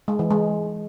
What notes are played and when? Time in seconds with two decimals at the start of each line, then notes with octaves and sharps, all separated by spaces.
0.08 G#3
0.19 E3
0.31 G#3